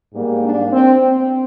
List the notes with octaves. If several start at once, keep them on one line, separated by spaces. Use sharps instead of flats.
G#2 G3 A#3
D4
C4
C4